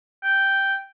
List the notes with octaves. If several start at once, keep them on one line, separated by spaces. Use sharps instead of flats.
G5